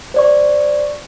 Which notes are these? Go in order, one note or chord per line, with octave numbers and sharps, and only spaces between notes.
C5 D5 C#6